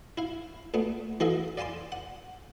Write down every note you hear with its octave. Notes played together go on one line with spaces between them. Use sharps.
E4 F5
A#2 A3 B3
E3 F#4 A4 D#5 F5
D5 F5 G#5 A5 C6
F#5